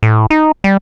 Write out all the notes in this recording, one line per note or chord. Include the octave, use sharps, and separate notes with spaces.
A2
D#4
G3